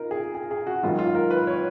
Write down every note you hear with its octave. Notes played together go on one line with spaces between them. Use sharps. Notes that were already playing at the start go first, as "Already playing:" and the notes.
Already playing: D#4 F4 A#4
G#4
G#4
G#4
F#4
G#2 D#3 F#3 F4
F4
A#4
B4
C#5